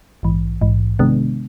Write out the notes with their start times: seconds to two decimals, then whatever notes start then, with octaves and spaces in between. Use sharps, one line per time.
0.23 A#1 G#2 E3
0.61 A#1 G#2 E3
0.99 C3 D#3 G#3 B3 D4